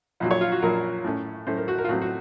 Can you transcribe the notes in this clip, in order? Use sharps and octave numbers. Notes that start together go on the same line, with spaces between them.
A#1 A#2 F#3
C#5
F4
F#4
A#1 A#2 F#3 A#4
A2 A3 C#4
A2 A3 C#4 C5
A#4
F#4
A#4
F4
A2 F#3 C4 F#4
F#4